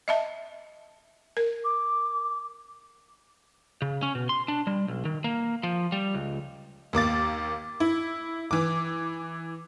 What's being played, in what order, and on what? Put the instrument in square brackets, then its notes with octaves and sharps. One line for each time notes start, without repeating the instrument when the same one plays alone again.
[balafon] D#5 E5 A5
A#4
[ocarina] D6
[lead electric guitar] C#3
C#4
B2
C6
D4
G3
B1
D#3
A#3
F3
G3
C#2
[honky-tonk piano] D#2 A#3 D6 A6
E4
E3 D6